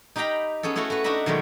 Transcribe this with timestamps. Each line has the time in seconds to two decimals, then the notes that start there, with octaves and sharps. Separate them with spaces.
0.16 D#4 G4 F5 G5 A#5 B5
0.63 B3 C#4 G#4 A4
0.76 A3 E4 F#4 A4 F5
0.90 F#4 B4
1.04 D4 D#4 F#4 E5 A#5 B5
1.26 B2 D#3 F#3 G#3 A3